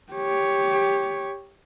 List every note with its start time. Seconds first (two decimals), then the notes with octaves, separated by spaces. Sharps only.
0.13 G4 C#5